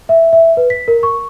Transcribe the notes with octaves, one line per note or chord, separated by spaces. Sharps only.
E5
E5
B4
B6
A#4
C#6